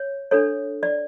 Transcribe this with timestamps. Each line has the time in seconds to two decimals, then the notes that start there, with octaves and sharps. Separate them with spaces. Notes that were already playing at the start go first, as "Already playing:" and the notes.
Already playing: C#5
0.31 D4 A4 C#5
0.83 D5